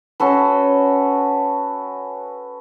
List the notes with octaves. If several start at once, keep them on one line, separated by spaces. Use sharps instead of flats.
C#4 F#4 A4 B4